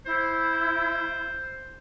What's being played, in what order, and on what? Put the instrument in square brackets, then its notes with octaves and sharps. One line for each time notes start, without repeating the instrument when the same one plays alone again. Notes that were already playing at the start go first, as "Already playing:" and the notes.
[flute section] E4 [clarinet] C5